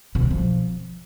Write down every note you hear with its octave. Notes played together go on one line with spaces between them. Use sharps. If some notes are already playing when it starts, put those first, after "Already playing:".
B2
D#3
F3